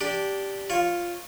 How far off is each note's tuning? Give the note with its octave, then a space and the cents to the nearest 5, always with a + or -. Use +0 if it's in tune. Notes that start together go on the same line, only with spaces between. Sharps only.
D4 -10 G4 +0
F4 +0 C#5 -20